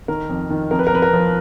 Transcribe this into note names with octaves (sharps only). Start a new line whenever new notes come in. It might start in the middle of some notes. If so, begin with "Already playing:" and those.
D#3 A#4
F2
D#3
F2 A#4
B4
A#4
F2 B4
A#4
F3